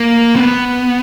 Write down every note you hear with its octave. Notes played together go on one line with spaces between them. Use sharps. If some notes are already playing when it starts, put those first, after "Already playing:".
Already playing: A#3
C4
B3